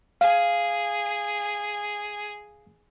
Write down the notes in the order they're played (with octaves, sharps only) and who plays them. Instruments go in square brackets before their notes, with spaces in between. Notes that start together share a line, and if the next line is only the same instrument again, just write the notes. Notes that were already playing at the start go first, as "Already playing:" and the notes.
[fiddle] G#4 [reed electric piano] F5